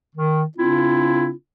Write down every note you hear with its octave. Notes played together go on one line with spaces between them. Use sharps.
D#3
C#3 C4 D4 E4 F4